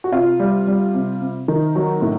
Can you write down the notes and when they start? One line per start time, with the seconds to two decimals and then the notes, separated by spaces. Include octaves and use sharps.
0.04 F#4
0.12 C3 F4
0.39 G3
0.67 G3
0.94 C3
1.21 C3
1.48 D#3
1.75 F#3 F#4
2.02 A2